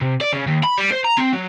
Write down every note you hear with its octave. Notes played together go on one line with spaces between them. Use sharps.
C3
D5
C#3
D#2
B5
G3
C5
A#5
C4
F#3